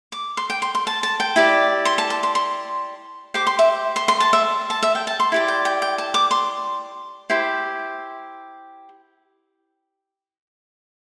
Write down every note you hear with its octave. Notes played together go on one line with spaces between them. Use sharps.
D6
C6
G5
C6
C6
A5
A5
G5
E4 G4 D5
C6
A5
A5
C6
C6
G4 C5 D6
C6
E5
C6
C6
A5
E5
A5
E5
G5
A5
C6
E4 G4 D5 C6
G5
G5
G5
A5
D6
C6
E4 G4 C5 C6